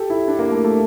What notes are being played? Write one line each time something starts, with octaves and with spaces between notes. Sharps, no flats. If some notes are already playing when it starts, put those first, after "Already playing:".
Already playing: G4 A4
E4
D4
A#3
A3
A3